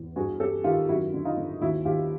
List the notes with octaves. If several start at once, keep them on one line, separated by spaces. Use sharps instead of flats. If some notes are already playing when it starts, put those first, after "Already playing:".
Already playing: E2
G2 F#4 G#4
G2 G4 A4
D#3 F4 G4
F#2 E4 F#4
D3
D#4 F4
D3
D#2 E4 F#4
D#2 F4 G4